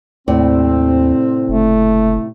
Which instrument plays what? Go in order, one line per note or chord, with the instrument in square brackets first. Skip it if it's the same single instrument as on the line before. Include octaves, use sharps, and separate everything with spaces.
[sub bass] D#2 [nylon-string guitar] A2 C3 D5 [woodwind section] C4
[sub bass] F#1 [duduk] A3